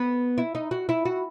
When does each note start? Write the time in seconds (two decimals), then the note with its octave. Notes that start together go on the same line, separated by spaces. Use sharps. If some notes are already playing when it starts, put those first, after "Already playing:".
Already playing: B3
0.38 E4
0.55 D#4
0.71 F#4
0.89 E4
1.05 F#4